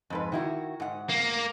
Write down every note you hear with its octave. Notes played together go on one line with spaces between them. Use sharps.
F2 G#2 B4
D#3 E4 F#4
G#2 F#5
A#3